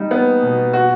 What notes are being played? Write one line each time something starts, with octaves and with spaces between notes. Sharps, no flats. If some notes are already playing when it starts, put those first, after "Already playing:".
Already playing: G3 D#4
B3
B2
F#4